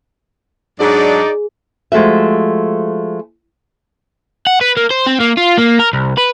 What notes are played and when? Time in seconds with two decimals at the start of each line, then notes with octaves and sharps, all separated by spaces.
0.80 G#2 F#3 D4 D#4 G#4 D5
1.92 F3 G#3 A3 F#4 E5
4.47 F#5
4.61 B4
4.77 A#3
4.91 C5
5.07 C4
5.20 A#3
5.38 F4
5.58 A#3
5.80 A#4
5.93 C2
6.17 B4